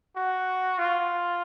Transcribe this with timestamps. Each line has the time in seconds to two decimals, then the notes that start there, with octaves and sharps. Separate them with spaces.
0.16 F#4
0.78 F4